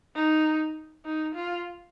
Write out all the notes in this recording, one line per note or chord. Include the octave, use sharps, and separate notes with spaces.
D#4
D#4
F4